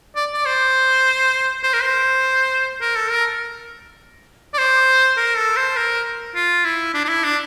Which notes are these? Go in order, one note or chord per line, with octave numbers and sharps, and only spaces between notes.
D5
D5
C5
C5
A#4
C5
A#4
A4
A#4
D5
C5
A#4
A4
C5
A#4
F4
E4
D4
D4
E4
D4